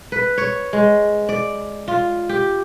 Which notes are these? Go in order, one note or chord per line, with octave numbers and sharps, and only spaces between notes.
B4
C#5
G#3
D5
F4
G4